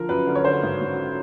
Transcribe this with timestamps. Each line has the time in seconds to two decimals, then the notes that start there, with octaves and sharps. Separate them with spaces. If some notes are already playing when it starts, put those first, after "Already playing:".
Already playing: D3 F3 A#4
0.09 F#2 B4
0.27 D3
0.35 C#5
0.45 D3 C5
0.63 G#1
0.81 G#1